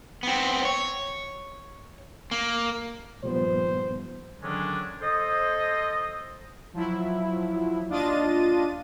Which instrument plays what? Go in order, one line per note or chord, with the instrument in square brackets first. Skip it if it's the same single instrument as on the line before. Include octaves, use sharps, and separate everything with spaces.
[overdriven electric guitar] B3 C4
C#5
A#3
[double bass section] G2 D#3 F3 [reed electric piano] A#2 G3 B3 [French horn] C5
[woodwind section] D3 D#3 F#3 G#3 C#4 D4
A4 C5 D#5
[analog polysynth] F3 F#3 E4
D#2 D4 F4 D#5 A6 D#7